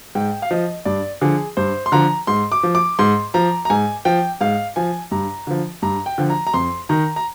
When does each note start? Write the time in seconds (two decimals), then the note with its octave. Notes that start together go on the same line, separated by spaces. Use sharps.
0.15 G#2 G5
0.42 F5
0.51 F3 D#5
0.85 G2 D5
1.21 D3 F3 G#4
1.57 G2 C5
1.86 C6
1.92 D3 F3 A#5
2.27 G#2 C6
2.52 D6
2.63 F3
2.75 D6
2.99 G#2 C6
3.34 F3 A#5
3.65 A#5
3.70 G#2 G#5
4.05 F3 G5
4.41 G#2 F5
4.76 F3 G#5
5.11 G2 A#5
5.47 D3 F3
5.82 G2 A#5
6.06 G5
6.18 D3 F3
6.30 A#5
6.47 A#5
6.54 F2 C6
6.89 D#3 A#5
7.16 A#5